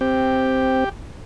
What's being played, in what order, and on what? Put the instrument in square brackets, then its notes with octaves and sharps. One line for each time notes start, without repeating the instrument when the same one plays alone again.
[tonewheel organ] C4 [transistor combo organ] G4